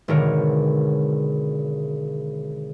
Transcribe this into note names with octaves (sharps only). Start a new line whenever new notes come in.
G#1 B2 D3 A#4 C#5 C#7